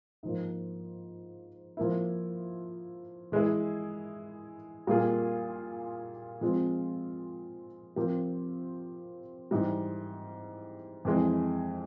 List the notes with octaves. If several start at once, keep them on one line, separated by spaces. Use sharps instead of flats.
G#2 F3 A#3
F3 A#3 E4
E3 G#3 E4 G#4
A#2 G3 A#3 F4 G#4
F3 G#3 C4 F4
C3 F3 C4 G4 A#4
G#2 E3 G3
F2 E3 G#3